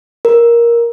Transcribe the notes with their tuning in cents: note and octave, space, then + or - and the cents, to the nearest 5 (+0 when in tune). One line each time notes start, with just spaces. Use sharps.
A#4 +10